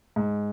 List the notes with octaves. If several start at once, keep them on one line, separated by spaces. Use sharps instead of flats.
G#2